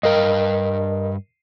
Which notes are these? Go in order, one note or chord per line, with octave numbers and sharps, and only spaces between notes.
G2 A#4 D#5 F5 G5